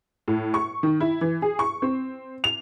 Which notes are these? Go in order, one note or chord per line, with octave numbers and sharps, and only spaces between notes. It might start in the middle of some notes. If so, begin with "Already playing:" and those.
A2
C#6
D#3
E4
E3
G#4
C#6
C4
F7